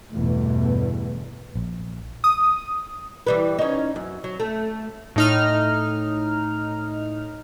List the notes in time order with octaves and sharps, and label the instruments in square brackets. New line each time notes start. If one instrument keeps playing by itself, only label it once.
[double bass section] G1 E2 G2 B2 E3 A3
[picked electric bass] A#1
[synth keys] D#6
[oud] E3 G3 B4
C#4 D#4
F#2
F#3
A3
[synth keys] A2 D#4 F6